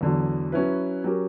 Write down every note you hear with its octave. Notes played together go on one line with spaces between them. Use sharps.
E2 D3 F#3
F#3 C#4 E4 B4
F#3 C#4 G4 A#4